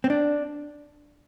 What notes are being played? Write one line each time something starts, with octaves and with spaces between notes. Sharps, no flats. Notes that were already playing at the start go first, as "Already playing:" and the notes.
C4
D4